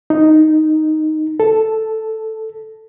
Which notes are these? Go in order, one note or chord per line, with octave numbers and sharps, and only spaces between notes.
D#4
A4